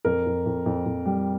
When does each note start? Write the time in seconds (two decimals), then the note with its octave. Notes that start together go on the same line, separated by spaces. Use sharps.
0.05 F2 A#4
0.26 F2
0.46 F2
0.66 F2
0.86 F2
1.06 G3